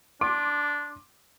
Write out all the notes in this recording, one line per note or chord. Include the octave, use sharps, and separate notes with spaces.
D4 C6 D6 D7